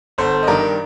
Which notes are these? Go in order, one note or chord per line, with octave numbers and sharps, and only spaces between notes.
G1 A4 C5
D#5
G2 D#3 A#4 D5